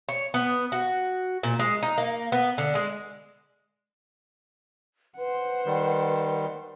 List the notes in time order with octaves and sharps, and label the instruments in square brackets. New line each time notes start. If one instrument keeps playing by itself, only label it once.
[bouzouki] C#5
B3
F#4
A#2
G#3
D#4
A#3
B3
D3
G#3
[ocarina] B4 [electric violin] C5 F#5
[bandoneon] D#3 G3